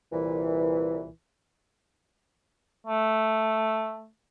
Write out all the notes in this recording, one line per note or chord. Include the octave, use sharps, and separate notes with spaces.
C2 A#2 E3
A3